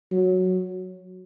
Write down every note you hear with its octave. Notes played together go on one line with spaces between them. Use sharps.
F#3